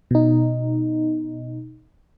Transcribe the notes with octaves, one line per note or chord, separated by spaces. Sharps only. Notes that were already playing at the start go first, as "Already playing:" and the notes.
B2 D#4